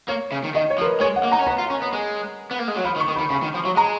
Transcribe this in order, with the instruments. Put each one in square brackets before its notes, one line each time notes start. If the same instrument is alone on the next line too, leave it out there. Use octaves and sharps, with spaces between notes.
[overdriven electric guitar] A#3 [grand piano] C#5
[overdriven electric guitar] C#3
D#3
[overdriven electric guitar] D#3 [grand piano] D#5
[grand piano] C#5
[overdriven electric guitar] F3
[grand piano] A#4
B4
[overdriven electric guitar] G#3 [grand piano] C#5
[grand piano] F#5
[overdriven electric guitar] A#3
[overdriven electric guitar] D#4 [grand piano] A#5
[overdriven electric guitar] C#4
[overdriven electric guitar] B3 [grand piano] A#5
[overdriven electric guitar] F4
C#4
B3
G#3
B3
A#3
G#3
F#3
[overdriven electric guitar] F3 [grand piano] B5
[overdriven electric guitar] D#3
[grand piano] C#6
[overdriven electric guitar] D#3
[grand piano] B5
[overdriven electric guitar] D#3
[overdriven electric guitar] C#3 [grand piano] B5
[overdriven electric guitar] D#3
F3
F#3
[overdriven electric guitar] G#3 [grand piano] A#5